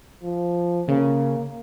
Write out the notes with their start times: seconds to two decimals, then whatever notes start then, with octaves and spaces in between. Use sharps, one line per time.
0.23 F3
0.88 C#3 A#3